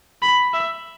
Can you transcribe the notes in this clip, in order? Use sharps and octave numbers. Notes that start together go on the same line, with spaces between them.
B5
E5